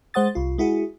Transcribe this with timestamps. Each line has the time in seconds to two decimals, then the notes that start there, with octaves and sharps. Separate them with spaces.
0.14 G#3 C5 F#5 D#6 A6
0.35 C2 F4
0.58 G#3 E4 F#4 G#4